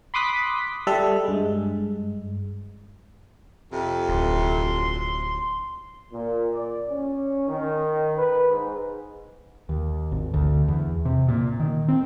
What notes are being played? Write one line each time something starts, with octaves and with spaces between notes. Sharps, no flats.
B5 C6 D6 D#6 F#6 B6
G3 A4 E5
G2 G#3
F2 C3
D1 C6
A#2
D5
C#4
D#3
B4
G#2
D#2
G#1
D2
E2
C3
A#2
D#3
C4